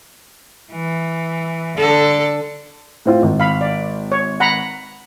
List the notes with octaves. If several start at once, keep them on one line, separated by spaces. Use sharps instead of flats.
E3
D3 A4
A2 C4 F4
G#1
F5 B5
D5
C#5
F#5 A#5 B5